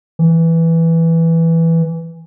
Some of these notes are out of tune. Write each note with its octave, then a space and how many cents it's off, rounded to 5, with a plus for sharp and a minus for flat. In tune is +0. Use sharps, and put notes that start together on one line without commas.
E3 +0